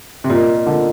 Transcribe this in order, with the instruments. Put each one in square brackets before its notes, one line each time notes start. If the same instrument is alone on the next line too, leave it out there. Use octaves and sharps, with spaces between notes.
[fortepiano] C3
[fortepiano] A#2 [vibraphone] F4 A#4 D#5
[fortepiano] D3